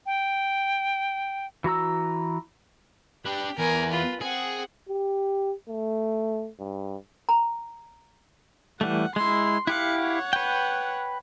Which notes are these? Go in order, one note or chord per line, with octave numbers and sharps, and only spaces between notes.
G5
E3 F#4 A#5 E6
D4 G4 B4
E2 A#4 G#5
F4 B4
C4 G#4 F#5
G4
A3
G2
A#5
E3 G3 A3 F#5
G#3 E4 C6
E4 G4 F5 F#6 C#7
C#5 F#5
B4 G5